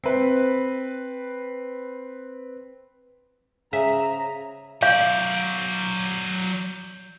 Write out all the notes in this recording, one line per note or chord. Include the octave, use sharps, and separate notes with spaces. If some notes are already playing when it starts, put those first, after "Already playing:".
C4 B4
C#3 G#4 E5 A#5
F#3 D5 F5 G6